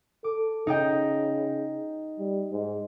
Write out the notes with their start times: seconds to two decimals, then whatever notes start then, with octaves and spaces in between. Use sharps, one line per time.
0.24 A4 D6
0.67 C#3 D#4 D#5 G5
2.19 G3
2.52 G#2